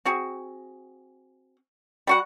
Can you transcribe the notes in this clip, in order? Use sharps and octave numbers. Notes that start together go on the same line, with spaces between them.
C4 F#4 G#4
G3 F#4 F#5